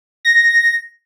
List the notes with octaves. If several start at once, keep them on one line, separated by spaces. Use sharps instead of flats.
A#6